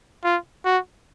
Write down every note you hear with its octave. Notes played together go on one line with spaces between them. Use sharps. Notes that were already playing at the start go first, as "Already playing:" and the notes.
F4
F#4